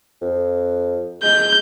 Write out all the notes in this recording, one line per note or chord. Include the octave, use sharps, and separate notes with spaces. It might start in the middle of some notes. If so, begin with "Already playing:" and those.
F2
G#3 G6